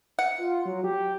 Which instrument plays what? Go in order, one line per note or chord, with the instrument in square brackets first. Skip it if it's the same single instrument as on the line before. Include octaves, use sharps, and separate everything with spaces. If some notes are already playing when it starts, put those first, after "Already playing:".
[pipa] F#5
[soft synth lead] F4
F#3
G4